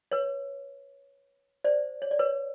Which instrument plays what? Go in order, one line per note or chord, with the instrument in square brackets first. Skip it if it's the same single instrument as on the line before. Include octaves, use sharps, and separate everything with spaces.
[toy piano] B4 C#5
C5 D5
C#5
D5
B4 C#5